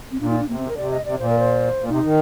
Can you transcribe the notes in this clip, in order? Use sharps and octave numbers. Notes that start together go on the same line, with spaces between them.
C4
A#2 D4
D#4
D4
C3 A#3
C4
D3 A#4
C3 D5
D#5
C3 D5
A#2 C5
A#4
C5
A#2
C3 D#4
D#3